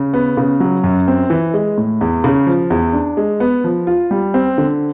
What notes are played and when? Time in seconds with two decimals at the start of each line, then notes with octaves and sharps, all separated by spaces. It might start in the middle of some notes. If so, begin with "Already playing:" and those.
Already playing: C#3
0.14 B3
0.37 C#3
0.60 F#3
0.84 F#2
1.08 C4
1.30 E3
1.54 G#3
1.78 A2
2.01 E2
2.24 C#3
2.47 F3
2.70 E2
2.93 D4
3.17 G#3
3.40 B3
3.64 F3
3.87 F4
4.11 G3
4.34 C4
4.58 D3